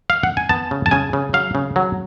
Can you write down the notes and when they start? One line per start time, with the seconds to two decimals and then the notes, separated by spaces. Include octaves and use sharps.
0.10 F5
0.23 F#5
0.37 G#5
0.49 B3 A5
0.71 C#3
0.86 A5
0.91 C#3 G#5
1.13 C#3
1.33 F#3 F5
1.55 C#3
1.76 F#3